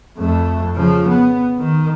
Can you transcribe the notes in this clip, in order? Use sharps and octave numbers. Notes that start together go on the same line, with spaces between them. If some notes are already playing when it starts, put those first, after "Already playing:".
F2 A3
C#3 F3
B3
D#3